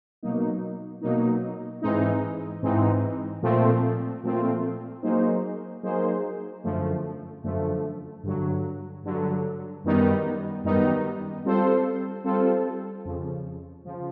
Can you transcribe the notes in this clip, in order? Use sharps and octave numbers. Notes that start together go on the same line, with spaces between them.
B2 F#3 A#3 D#4
B2 F#3 A#3 D#4
G#2 E3 G#3 C4 D#4
G#2 E3 G#3 C4 D#4
A#2 F3 A3 C4 F4
A#2 F3 A3 C4 F4
F#3 A#3 D#4 G#4 C5
F#3 A#3 D#4 G#4 C5
F#2 D3 F3 A3
F#2 D3 F3 A3
G2 D3 F#3
G2 D3 F#3
F#2 D#3 G3 B3 D#4
F#2 D#3 G3 B3 D#4
G3 C4 F4 A4 C5
G3 C4 F4 A4 C5
F2 C#3 F3
C#3 F3